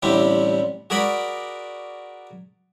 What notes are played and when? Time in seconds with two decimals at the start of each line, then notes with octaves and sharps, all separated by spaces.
0.02 A1 D3 G3 C4 D4 E4
0.90 F#4 G#4 A#4 D5 B5